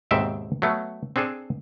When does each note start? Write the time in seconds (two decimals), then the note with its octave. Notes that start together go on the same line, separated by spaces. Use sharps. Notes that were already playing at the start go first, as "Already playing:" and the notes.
0.11 D#2 G#2 B2 C4 E5 G5
0.62 F#3 A3 B3
1.16 C4 D4 G#4 A4 C5